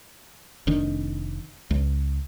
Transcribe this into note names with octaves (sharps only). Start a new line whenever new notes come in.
F1 D#3 D4
C#2